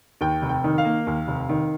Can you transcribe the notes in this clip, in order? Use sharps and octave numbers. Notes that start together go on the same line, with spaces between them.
D#2 G5
F1
G5
D#3
F5
A#3
D#2
F1
D#3